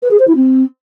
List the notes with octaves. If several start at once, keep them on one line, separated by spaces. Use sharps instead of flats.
B4
G#4
C5
E4
C4